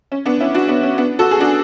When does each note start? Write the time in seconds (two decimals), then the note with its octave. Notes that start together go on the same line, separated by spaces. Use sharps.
0.12 C#4
0.26 B3 D4
0.40 C#4 E4
0.55 D4 F#4
0.68 B3 D4
0.83 C#4
0.98 B3 D4
1.19 F#4 A4
1.31 G#4
1.40 D4 F#4